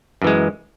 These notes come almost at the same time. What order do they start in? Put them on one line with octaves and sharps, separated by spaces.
F#2 E3 G#3